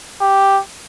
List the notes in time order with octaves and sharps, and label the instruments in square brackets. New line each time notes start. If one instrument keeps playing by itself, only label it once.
[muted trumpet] G4